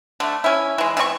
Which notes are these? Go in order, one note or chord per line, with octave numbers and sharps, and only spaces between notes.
D3 A3
C#4 E4
E3 G#3
E3 C4 D5 C#6